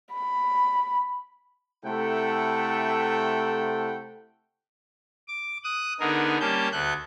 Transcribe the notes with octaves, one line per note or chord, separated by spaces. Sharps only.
B5
C3 A3 E4 A4 F#5 G5
D6
D#6 F#6
D3 B3 D#4 G#4 A#4
G3 A#3 C#4 A5 G6
D2 A3 F#6 G6